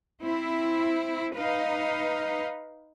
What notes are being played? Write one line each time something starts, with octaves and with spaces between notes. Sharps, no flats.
C4 E4
D#4 B4 F5